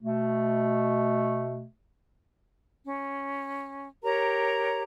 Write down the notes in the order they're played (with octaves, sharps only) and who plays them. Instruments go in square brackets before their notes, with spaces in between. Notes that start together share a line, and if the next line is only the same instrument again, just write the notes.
[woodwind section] B2 A3
[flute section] C#4
G4 A#4 C#5 A#5